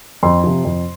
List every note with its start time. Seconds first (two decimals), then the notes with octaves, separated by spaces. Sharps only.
0.23 F2 C6
0.44 C3 F3
0.65 F2